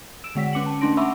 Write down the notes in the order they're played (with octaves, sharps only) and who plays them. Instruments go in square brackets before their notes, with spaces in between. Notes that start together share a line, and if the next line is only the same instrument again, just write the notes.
[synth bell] E6 D7 E7
D3 G#3 F#5 B6
C#4 D6 C#7 F#7
A5
A3 C#4 D4 C6 A#6 D7
E5 F#5 B5 C#6 D6 E6